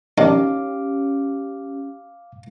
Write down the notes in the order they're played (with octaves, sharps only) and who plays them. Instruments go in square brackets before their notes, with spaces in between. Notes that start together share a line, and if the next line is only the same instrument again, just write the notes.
[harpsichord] D#3 D4 [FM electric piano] C#4 G4 [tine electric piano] F5 D6